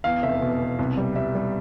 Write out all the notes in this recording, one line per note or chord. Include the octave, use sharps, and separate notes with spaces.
E2 F5
F1 E5
B2
B2
C2
G3
G3 E5
G3